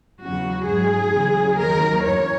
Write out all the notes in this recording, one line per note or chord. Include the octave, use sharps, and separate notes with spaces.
E2 C#3 F#3 F#4
G#2 F#3 G#4
E2 C#3 F#3
D#2 D#3 F#3 A#4
F#2 E3 C#5